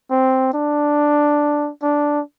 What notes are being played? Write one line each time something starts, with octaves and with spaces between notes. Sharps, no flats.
C4
D4
D4